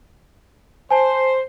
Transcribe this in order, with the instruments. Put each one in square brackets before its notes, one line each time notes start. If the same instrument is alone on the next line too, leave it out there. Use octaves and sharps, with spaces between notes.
[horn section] C5 [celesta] G#5 A5